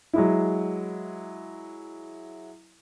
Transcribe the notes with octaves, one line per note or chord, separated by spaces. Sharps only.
F#3 G#3 E4